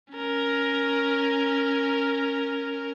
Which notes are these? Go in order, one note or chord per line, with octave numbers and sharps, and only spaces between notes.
C#4 A#4